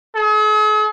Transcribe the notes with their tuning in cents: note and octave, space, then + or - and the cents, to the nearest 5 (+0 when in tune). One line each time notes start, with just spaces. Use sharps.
G#4 +45